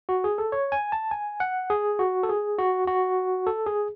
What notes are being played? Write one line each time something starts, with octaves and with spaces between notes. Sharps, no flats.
F#4
G#4
A4
C#5
G#5
A5
G#5
F#5
G#4
F#4
A4
G#4
F#4
F#4
A4
G#4